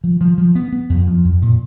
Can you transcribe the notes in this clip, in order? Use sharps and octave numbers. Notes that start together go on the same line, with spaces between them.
F3
F3
F3
B3
B3
F2
F3
F2
A#2